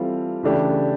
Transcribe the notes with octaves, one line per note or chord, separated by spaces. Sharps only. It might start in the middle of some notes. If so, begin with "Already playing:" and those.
Already playing: E3 G3 C4 F4 A4
C#3 E3 A3 D4 G4